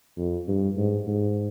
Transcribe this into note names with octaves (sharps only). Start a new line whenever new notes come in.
F2
G2
G#2
G#2